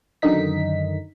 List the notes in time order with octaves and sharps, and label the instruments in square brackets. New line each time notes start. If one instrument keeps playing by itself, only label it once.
[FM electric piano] F#2 D3 D#3 D#4 B6